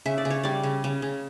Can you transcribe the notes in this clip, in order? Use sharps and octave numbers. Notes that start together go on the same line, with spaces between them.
C#3 E5
D5
C#3
C#5
G3 D5
C#3
C#3
C#3